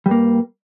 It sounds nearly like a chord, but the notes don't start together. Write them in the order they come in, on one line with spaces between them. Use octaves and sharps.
G3 G2 A#3